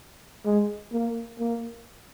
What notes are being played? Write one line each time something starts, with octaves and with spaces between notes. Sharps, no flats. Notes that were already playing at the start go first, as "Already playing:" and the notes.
G#3
A#3
A#3